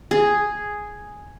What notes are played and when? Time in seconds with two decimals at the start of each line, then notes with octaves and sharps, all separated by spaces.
0.11 G#4